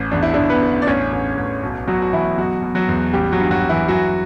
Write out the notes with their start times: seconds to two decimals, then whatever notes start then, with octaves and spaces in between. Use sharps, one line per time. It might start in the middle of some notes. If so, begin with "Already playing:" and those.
Already playing: A1
0.11 E2 D4
0.22 E4
0.34 E2 D3 D4
0.50 B3 B4
0.62 D3
0.82 D5
0.87 A1 C#4 C#5
1.13 A1
1.37 A1
1.63 B1
1.87 B2 F#3 F#4
2.02 F#4
2.12 B2 E3 E4
2.37 B2 F#3 F#4
2.62 B2
2.75 F#3 F#4
2.88 E2
3.13 A1 G3 G4
3.32 F#3 F#4
3.38 G2
3.51 F#3 F#4
3.64 G2
3.69 E3 E4
3.88 E3 F#3 F#4